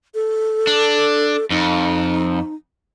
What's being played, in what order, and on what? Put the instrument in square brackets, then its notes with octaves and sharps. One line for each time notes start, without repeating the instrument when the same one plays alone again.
[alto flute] A4
[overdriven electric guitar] D4
[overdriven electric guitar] F2 [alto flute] D#4